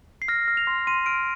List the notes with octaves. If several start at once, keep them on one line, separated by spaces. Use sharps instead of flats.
C7
F6 A#6
F6
F7
C6
C6 D#7
F6 D7